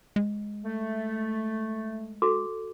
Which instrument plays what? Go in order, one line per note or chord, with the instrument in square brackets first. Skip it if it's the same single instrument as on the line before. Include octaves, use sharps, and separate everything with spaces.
[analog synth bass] G#3
[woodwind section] A3
[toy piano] F#4 A4 D6